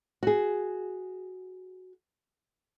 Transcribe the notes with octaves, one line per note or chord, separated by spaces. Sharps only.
F#4 G#4